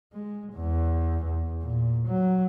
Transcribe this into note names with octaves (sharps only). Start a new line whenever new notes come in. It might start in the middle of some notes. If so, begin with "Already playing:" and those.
G#3
E2
E2
A#2
F#3